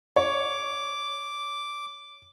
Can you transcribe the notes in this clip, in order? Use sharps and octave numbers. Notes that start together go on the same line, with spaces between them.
C#5 D6